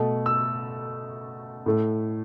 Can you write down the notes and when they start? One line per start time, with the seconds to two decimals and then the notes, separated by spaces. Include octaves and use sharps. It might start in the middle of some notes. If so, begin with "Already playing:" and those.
Already playing: B2 A3
0.26 E6
1.66 A2 A3